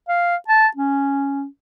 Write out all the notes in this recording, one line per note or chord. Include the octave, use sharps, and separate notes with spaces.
F5
A5
C#4